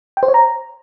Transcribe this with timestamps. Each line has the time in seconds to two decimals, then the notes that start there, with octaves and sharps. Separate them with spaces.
0.17 G5
0.23 C5
0.28 C#5
0.34 A#5